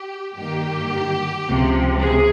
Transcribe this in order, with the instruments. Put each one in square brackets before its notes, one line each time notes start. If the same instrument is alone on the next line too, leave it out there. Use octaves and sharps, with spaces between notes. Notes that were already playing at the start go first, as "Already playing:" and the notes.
Already playing: [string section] G4
G2 D#3 A#3 G4
C#2 C3 F3
G#4